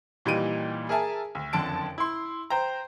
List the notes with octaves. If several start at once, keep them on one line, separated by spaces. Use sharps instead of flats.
A#2 E3 G3 D#4 D7 D#7
G#4 A#4 E5 G#5 A5
D2
F#1 F2 D3 A5 D7
E4 C6
C5 G5 A#5